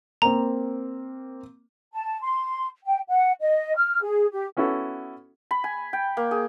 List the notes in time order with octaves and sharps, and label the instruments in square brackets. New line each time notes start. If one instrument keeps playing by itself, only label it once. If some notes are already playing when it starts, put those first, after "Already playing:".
[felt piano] A#3 C4 [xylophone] A#5
[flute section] A5
C6
G5
F#5
D#5
F6
G#4
G4
[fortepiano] B3 C#4 E4 F#4 A4
[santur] B5
G#5
G5
A#3
G#4